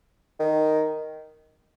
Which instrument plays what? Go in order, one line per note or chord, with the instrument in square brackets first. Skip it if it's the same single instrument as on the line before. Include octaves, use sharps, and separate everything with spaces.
[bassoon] D#3